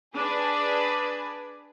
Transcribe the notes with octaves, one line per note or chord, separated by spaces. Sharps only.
D4 G#4 B4